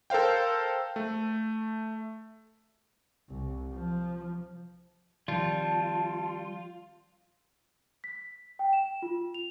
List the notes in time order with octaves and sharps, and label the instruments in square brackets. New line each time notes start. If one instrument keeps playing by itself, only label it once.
[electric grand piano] A4 A#4 C5 F5 G5
A3
[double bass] C2
F3
[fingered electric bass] D#3 F3 C4 [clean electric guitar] G3 [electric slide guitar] F4 [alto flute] A5
[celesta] B6
G5
E7
F4
F7